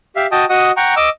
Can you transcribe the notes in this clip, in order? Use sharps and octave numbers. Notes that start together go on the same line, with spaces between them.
G4 E5 F5
F#4 D#5 G5 A5 D#6
F#4 D#5 F#5 D#6
F#5 G5 A#5 C#6
D#5 D6 E6